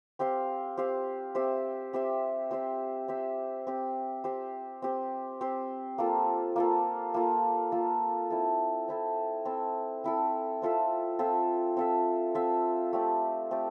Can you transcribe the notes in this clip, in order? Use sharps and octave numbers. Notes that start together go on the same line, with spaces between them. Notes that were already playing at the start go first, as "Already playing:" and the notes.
C4 G4 C5 F5
C4 G4 C5 F5
C4 G4 C5 E5
C4 G4 C5 E5
C4 G4 C5 E5
C4 G4 C5 E5
C4 G4 C5
C4 G4 C5
C4 G4 C5
C4 G4 C5
A#3 F4 A4
A#3 F4 A4
A#3 F4 A4
A#3 F4 A4
C4 E4 A4
C4 E4 A4
C4 E4 A4
C4 E4 A4
C4 F4 A4 E5
C4 F4 A4 E5
C4 F4 A4 E5
C4 F4 A4 E5
A3 C4 G4 D5
A3 C4 G4 D5